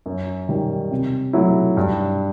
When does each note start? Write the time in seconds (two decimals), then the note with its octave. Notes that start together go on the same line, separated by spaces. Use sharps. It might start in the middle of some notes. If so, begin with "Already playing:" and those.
0.06 F#2
0.49 D#3 G3
0.91 C3
1.33 F#3 A3 E4
1.77 G2